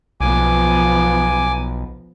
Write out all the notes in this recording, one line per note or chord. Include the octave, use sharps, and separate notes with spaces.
B1 F3 B3 G#5 D6